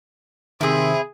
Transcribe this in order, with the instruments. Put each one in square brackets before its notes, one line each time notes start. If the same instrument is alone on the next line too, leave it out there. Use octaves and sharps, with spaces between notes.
[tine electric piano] C3 D#3 [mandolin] C4 E4 [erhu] G#4